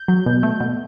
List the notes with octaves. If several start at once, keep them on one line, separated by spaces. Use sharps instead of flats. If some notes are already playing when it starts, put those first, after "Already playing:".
Already playing: G6
F#3
B2
A3
B2